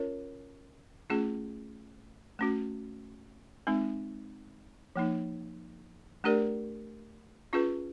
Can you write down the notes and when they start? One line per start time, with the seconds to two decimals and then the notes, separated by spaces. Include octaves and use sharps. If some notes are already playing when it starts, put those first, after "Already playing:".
Already playing: C#4 F4 A#4 C#5
1.10 A3 C#4 F4 G#4
2.39 A3 C#4 F#4
3.67 G#3 C4 D#4
4.96 F3 A#3 D#4
6.24 A3 D4 G4 A#4 D5
7.53 C#4 F4 G#4 B4